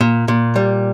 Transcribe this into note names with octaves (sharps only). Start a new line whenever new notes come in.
A#2
A#2
G3